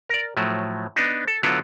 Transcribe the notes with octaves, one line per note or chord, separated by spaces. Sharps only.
A#4 D5
A2 F3 F#3 A3
B3 D4 D#4
A4
D3 F#3 B3 E4 F4 A4